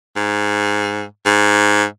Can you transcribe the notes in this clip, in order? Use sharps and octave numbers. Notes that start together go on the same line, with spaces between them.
G#2
G#2